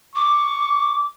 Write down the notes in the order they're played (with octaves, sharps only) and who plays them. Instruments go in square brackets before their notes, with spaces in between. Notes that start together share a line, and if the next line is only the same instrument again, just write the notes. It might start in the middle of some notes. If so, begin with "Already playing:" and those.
[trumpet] C#6 [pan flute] D6